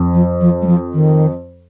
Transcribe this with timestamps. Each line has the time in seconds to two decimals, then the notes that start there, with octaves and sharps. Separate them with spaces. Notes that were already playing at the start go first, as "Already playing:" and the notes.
Already playing: F2
0.14 F3
0.41 F3
0.62 G3
0.67 F3
0.94 D#3